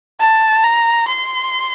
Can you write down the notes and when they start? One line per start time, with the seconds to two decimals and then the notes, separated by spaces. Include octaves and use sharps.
0.20 A5
0.64 A#5
1.07 C6